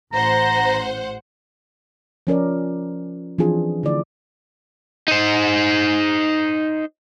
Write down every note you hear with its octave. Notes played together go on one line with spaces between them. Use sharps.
A1 C5 F#5 A#5
F3 C#4 A#4 D5
E3 F3 C4 D4 F4 G#4
D3 A3 E4 D5
D#4 C5